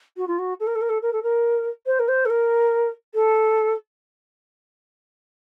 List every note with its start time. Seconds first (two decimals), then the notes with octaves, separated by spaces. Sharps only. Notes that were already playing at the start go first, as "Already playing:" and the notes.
0.17 F#4
0.27 F4
0.38 F#4
0.59 A4
0.66 A#4
0.75 A4
0.81 A#4
0.89 A4
1.02 A#4
1.12 A4
1.22 A#4
1.86 C5
1.99 A#4
2.08 C5
2.25 A4
2.29 A#4
3.14 A4